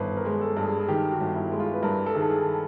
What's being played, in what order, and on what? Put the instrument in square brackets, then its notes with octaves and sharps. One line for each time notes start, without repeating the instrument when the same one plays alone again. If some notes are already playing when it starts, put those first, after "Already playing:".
Already playing: [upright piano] G1 D#3 [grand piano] B4 C5
[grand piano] A#4
[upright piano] G#3
[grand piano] A4
[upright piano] G2
[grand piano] G#4
G#4
[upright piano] D#3 [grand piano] G4
[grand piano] F#4
[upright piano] G1
[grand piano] E4
[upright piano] G#3
[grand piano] F4
B4
[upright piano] G2 [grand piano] A#4
[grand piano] A4
[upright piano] D#3 [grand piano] G#4
[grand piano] A4
G#4